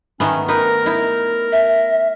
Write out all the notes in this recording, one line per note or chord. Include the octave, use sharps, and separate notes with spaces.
D#3 A3 B3 C#4
D#4 A#4 B4
D#4 E4
E5